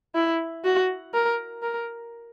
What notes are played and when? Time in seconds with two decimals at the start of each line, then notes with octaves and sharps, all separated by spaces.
0.15 E4
0.64 F#4
1.14 A#4
1.63 A#4